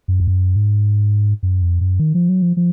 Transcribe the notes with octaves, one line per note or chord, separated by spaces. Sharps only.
F#2
F2
F#2
G#2
F#2
F2
F#2
D#3
F3
F#3
F3
F3